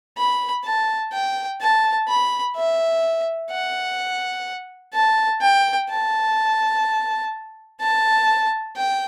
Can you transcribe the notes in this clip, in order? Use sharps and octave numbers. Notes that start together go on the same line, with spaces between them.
B5
A5
G5
A5
B5
E5
F#5
A5
G5
A5
A5
G5